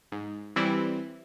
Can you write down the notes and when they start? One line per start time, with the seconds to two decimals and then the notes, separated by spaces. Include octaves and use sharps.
0.12 G#2
0.56 E3 G3 C4 E4